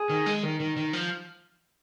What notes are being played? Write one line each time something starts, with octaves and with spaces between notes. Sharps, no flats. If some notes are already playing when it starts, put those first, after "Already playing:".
Already playing: G#4
D#3
G#3
D#3
D#3
D#3
F3